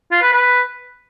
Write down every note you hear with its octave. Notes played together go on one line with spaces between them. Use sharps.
F4
B4
B4